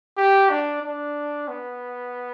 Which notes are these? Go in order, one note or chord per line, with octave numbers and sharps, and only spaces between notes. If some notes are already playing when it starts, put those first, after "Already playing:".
G4
D4
D4
B3